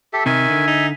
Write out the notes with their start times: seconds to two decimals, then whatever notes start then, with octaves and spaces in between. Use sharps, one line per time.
0.13 G4 A4 E5
0.26 C3 D#3 E5 G#5
0.50 D3
0.68 D#4